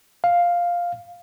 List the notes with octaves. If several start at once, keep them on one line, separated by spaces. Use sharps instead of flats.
F5